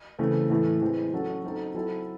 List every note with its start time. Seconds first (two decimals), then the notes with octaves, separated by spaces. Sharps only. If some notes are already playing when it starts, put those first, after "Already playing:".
0.19 C#3 E3 A3 C4
0.50 A2 E3 A3
0.81 E3 G#3 C4
1.13 F#3 C#4 F#4 A4
1.43 F#3 C4 D#4 A4
1.74 F#3 C4 E4 A4